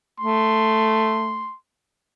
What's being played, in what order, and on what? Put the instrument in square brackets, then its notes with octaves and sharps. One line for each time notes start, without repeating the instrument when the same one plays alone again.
[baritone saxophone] A3 [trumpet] C6